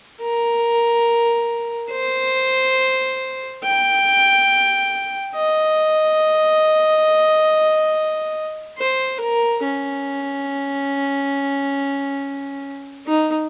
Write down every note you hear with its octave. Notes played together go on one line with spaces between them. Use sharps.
A#4
C5
G5
D#5
C5
A#4
C#4
D#4